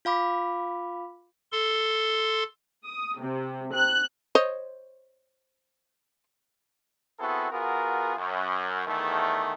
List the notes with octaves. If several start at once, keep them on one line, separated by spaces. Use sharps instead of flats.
F4 F5 B5 D6
A4 C6
D#6
C3
F#6
C5 C#5 D#5
B3 C4 E4 F#4 G#4 A4
B3 F4 F#4 G#4 A#4
F#2
E2 D#3 A3